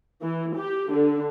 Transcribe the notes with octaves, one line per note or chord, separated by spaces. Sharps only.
E3
G4
D3